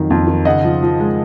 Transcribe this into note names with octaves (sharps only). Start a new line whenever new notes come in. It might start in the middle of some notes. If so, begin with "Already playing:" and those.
Already playing: F2 D#3 F#3
F2
D#3
C#3 D#5 F#5
F3
F3
G#3